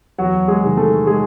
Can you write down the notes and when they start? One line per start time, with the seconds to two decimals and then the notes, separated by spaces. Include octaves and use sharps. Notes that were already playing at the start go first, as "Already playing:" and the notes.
0.18 E2 F#3 F#4
0.48 G#3 G#4
0.63 C3 D#3 F#3
0.77 A3 A4
1.07 G#3 G#4